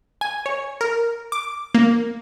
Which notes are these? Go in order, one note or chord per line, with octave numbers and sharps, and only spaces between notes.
G#5
C#5
A#4
D6
A#3